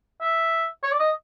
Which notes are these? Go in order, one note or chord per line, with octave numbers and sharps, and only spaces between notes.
E5
C#5
D5
D#5